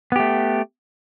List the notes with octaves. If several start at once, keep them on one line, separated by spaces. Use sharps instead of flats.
A3 B3 G4